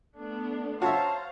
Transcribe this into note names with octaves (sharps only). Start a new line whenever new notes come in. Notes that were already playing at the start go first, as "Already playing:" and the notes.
A3 B3 D4
F#4 C5 C#5 E5 F5 A5 A#5